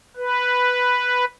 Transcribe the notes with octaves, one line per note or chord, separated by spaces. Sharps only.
B4